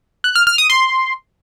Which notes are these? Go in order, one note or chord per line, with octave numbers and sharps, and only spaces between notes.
F#6
F6
F6
D#6
C6